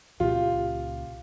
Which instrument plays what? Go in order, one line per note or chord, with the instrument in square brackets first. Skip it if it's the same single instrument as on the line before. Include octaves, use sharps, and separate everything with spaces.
[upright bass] C#2 A#2 [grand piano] F4 G4